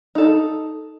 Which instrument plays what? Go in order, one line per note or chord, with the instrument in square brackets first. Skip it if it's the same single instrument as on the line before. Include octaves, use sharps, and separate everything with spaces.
[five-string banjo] D#4 A4